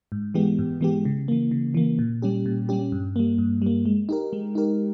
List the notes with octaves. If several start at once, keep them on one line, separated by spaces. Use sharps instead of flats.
G#2
E3 G#3 B3 G4
G#2
E3 G#3 B3 G4
C#3
E3 A#3
C#3
E3 A#3
A#2
G3 C#4 G4
A#2
G3 C#4 G4
G2
G3 A#3
G2
G3 A#3
G#3
D#4 G4 A#4
G#3
D#4 G4 A#4